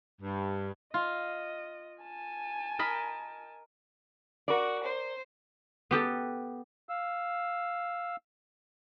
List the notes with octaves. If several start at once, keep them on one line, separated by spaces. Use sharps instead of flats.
G2
F4 D#5
G#5 A5
A#4 D#5 B5
F#4 A#4 D5
C5
B3 G4 A4
F5 E6